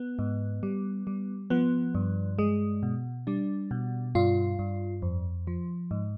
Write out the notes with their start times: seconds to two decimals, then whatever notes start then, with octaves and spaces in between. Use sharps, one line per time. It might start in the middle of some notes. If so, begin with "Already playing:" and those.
Already playing: B3
0.19 G#2
0.63 G3
1.07 G3
1.50 F3 B3
1.95 G2
2.39 G#3
2.83 B2
3.27 G3 D4
3.71 B2
4.15 G2 F4
4.59 G2
5.02 F2
5.47 F3
5.91 G#2